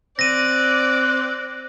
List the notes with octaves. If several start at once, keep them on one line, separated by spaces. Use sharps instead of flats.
C4 D5 F#6 A#6 D#7